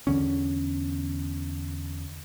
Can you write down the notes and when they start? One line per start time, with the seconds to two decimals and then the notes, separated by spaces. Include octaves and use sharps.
0.07 E2 D3 C#4